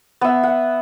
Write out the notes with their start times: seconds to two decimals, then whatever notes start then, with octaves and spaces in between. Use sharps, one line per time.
0.21 B3 E5
0.43 F#5